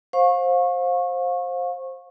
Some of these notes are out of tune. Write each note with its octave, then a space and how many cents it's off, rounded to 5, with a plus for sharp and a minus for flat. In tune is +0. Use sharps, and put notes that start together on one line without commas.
C5 +15 F5 +30 C#6 -20